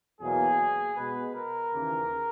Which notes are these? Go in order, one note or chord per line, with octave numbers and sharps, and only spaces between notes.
E2 B2 F#3 A#3 G#4
B2 G#3 B3 B4
A#4
D#2 C#3 E3 A#3